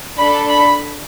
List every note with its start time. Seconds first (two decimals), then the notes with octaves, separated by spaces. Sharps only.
0.18 D4 A4 B5
0.49 B5